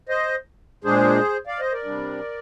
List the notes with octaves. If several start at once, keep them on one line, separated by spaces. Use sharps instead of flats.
C5 D#5
A#2 G#3 D4 G#4 C5
D5 F5
C5 D#5
A#4 D5
C3 G3 D4